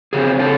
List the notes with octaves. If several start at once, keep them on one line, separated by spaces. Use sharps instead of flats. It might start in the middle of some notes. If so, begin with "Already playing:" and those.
F2 C#3 C4 G#4
A4